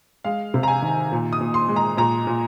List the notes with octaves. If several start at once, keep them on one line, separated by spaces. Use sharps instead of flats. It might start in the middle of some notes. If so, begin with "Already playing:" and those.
G#3 F5
C3
A#5
G#5
D#3
A#2
D#6
A#2
C6
G#3
A#5
A#2 A#5
A#2